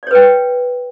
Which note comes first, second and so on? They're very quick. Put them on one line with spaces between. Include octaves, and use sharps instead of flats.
D5 C#5 B4 G5